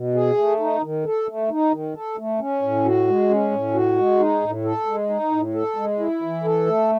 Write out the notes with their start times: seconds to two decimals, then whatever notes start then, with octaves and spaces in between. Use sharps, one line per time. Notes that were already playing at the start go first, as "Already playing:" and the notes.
Already playing: B2
0.14 G#4
0.38 A3
0.60 D#4
0.82 D#3
1.05 A4
1.27 A3
1.50 D#4
1.72 D#3
1.94 A4
2.17 A3
2.40 C#4
2.62 A2
2.85 F#4
3.07 G#3
3.29 C#4
3.51 A2
3.74 F#4
3.97 G#3
4.20 D#4
4.42 A2
4.65 A4
4.86 G#3
5.10 D#4
5.31 A2
5.54 A4
5.76 G#3
5.99 E4
6.22 E3
6.44 A4
6.66 A3